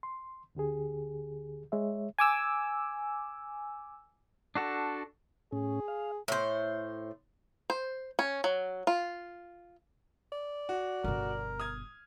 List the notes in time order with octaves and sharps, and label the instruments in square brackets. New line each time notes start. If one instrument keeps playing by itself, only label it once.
[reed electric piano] C6
D2 D3 G4 G#4
G#3 C#5 E5
[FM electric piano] G#5 D6 E6
[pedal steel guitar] D4 F#4 A4
[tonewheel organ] A2 C#4 [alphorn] G#4
[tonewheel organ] F5
[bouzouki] A2 C5
[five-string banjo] C5
C#4
F#3
F4
[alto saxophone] D5
[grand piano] F#4
[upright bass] G1 B2 [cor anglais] A#4
[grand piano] D#6 F6 G#6